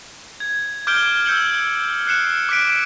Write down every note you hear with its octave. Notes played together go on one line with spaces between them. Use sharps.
G#6
D6 F6 G6 G#6 D7 G7
E6 G6 C#7 F#7
F#6 C7 C#7 E7
D6 F#6 B6 D7